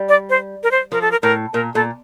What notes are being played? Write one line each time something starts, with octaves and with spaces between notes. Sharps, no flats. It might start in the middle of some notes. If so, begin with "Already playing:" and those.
Already playing: G3
D5
C5
A#4
C5
F3 A#4
A4
A#4
A2 A#4
A#2 A#4
A#2 A4